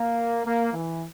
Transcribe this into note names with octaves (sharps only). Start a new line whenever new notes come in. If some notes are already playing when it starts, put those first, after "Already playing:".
Already playing: A#3
A#3
E3